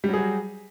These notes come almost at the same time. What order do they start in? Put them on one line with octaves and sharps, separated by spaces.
G3 F#3 G#4 F#4